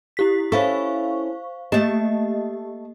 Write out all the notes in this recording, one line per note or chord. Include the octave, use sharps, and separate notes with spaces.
E4 G4 B6
C#4 E4 A4 C5 F5 C#6
A3 A#3 G4 D#5 A5